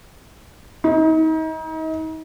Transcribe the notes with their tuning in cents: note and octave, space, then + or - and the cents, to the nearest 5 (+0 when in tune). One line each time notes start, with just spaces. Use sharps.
D#4 +35